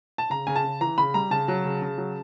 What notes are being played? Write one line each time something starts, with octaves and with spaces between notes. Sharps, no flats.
A5
C#3 A#5
C#3 G#5
A5
C#3
E3 A#5
C#3 B5
G3 A#5
C#3 A5
F#3
C#3
C#3
F#3